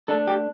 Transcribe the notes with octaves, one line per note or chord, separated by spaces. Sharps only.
A3 D4 A4
G4